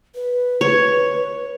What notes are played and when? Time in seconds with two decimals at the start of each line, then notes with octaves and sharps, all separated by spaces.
0.15 B4
0.61 C#5